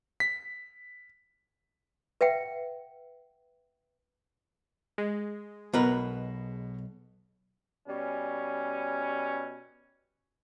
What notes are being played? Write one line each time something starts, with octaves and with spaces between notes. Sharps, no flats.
B6
B4 E5 F#5 G5
G#3
B1 B2 A#4 B4
B2 G3 C#4